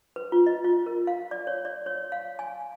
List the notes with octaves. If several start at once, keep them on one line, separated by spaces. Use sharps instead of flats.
B4
F4
D#5
F4
A#4
F5
D5
C#5
D5
C#5
F5
G#5